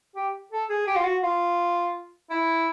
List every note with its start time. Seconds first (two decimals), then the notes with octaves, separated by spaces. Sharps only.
0.15 G4
0.52 A4
0.70 G#4
0.87 G4
0.95 F4
1.04 F#4
1.23 F4
2.30 E4